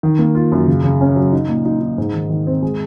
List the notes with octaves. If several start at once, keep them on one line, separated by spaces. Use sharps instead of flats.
D#3
A#3
F4
F#2
C#3
C#3
C#4
F#3
D#4
A#2
D#4
D#4
G#2
D#3
D#3
C4
G#3